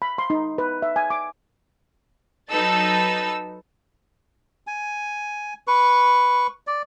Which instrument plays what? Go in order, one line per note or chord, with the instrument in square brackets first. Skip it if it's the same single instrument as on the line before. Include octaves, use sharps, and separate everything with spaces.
[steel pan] B5
C6
D#4
B4
E5
G#5
D6
[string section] F#3 D#4 A4 B4 E6 A6
[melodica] G#5
B4 C#6
D5